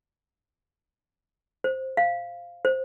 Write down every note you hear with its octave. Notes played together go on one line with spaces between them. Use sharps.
C5
F5
C5